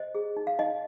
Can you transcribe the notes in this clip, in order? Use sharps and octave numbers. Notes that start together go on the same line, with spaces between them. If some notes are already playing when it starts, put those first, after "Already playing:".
Already playing: C5 D#5
G#4
D#4
F5
D#4 D#5